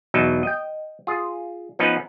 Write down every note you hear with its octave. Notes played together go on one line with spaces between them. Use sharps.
E2 B2 F#3 D#4
D#5 G5
F4 G#4
F3 B3 C#4 D#4 B4